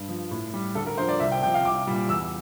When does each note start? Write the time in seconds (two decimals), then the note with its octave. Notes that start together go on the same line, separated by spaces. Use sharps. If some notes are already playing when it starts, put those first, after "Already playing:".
Already playing: G2
0.08 F3
0.31 A2
0.54 G3
0.75 D2 A4
0.86 A#4
0.98 D3 F3 C5
1.08 D5
1.20 C2 E5
1.32 G5
1.42 C3 G5
1.45 F3
1.54 F5
1.65 C2 D6
1.87 A#2 G3
2.09 E2 E6